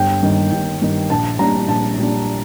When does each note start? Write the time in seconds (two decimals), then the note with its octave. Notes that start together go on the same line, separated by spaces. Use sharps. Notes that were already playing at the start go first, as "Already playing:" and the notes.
Already playing: G1 G5
0.22 G2 D#3
0.52 G1
0.82 G2 D#3
1.10 A#1 A5
1.39 A#2 G3 D4 A#5
1.68 A#1 A5
1.98 A#2 G3 D4